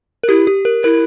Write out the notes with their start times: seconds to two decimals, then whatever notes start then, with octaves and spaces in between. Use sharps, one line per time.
0.23 A#4
0.29 E4 G4
0.47 G4
0.65 A#4
0.84 E4 A#4